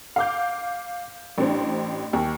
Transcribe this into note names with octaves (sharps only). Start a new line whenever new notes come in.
F5 D6 G6
A1 D4 C5
D#2